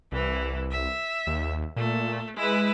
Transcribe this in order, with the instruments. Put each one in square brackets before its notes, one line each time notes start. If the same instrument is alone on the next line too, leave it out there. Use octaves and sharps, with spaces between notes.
[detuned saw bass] C2 [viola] E3 E4
[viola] E5
[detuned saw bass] D#2
[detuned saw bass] A#2 [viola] A3
[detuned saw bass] G#3 [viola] E4 B4